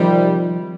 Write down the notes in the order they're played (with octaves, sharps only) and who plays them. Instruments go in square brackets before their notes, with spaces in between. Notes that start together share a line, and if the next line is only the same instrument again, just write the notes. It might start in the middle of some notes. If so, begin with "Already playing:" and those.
Already playing: [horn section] C3 D#3 G3 [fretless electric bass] F3